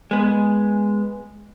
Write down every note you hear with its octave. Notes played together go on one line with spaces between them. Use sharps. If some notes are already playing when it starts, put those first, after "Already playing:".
G#3 B3